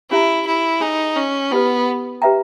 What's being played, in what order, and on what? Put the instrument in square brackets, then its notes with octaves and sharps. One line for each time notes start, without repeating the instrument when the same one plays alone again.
[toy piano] C#4 G4 C#5 E5 A#5 [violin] E4
[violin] E4
[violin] D#4 [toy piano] G#4 C#5 G#5
[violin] C#4
[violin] B3 [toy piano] E4 G4 B4
[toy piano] G4 B4 E5 G5 A#5